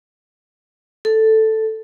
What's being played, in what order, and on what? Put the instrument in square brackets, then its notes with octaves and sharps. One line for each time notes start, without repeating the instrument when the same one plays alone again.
[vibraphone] A4